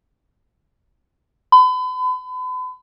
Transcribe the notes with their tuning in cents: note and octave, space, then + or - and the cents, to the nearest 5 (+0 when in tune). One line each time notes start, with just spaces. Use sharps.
B5 +40